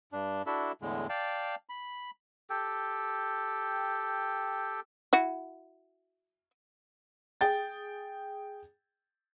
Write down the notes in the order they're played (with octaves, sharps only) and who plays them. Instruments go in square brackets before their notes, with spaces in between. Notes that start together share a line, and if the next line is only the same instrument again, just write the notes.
[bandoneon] G2 D4
D4 E4 F#4 A4 E5
E2 A2 D3 G#3
D5 F5 G5 A5
B5
[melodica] G4 A4 G5
[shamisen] E4 F#4
[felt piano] G#4 G5 A6